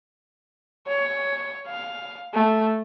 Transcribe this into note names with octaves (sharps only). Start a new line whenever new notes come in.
C#5
F5
A3